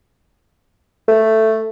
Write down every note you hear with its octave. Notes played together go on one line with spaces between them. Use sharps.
A3